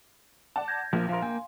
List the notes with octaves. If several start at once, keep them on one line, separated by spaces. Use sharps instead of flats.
D5 F#5 A5
G6 G#6 A#6
A#1 F3 A#3
F3 A#4 F5 C6
A#3 G5 G#5